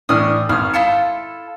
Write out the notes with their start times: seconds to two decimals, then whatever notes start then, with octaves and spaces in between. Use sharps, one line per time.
0.09 A2 E3 D4 D#6 F6
0.49 G#1 D#6 F6
0.74 E4 F4 A4 C#7